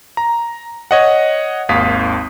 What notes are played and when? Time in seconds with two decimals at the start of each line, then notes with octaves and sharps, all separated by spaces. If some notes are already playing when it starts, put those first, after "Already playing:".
0.17 A#5
0.91 C#5 D#5 F#5
1.69 G#1 D#2 F5 D#6 B6